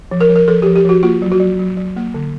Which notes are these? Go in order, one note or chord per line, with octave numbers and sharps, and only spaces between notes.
F3
A#4
F3
A#4
F3 A4
F3 G4
G4
F3 F#4
A#3 F4
F#3
F#4
F#3
F#3
F#3
A#3
D3